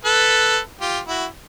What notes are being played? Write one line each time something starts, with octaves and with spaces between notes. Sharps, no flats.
A4 B4
F4 G4
E4 F#4